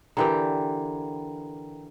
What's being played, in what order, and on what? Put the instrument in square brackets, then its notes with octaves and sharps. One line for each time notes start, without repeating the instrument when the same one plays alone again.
[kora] D3 E3 G4 [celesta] A#4 G5 A#5